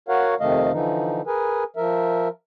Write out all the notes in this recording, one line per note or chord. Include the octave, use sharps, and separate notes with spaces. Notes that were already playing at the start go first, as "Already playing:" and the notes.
F#4 A#4 C#5 F5 F#5
F2 C3 D#3 A3 D#5 F5
D3 E3 F3 D#4
G#4 A#4 B4 G#5
F3 A#4 E5